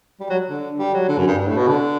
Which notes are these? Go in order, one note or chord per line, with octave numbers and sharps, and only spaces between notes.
G3
F#3
D3
G3
F#3
D3
F#2
G2
G2
A2
B2
D3